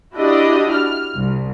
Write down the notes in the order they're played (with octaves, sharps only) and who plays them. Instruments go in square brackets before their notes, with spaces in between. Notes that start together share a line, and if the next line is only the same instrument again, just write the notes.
[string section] D4 E4 F#4 G4 D5 D#5
F6
C2